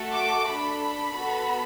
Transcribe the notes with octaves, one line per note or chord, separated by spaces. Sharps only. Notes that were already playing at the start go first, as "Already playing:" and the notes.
Already playing: A3 F#4 A4
D6
D4 A4 B5
B5
B3 F#4 A4